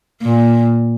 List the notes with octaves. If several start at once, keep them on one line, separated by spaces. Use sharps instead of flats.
A#2